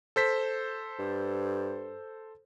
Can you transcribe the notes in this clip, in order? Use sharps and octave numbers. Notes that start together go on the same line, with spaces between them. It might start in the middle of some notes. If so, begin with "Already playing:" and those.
A4 C5 B6
G2